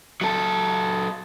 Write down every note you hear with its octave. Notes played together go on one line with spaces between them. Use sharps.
F#3 A4